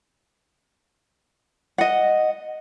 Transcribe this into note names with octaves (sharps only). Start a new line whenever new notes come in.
D#5 F#5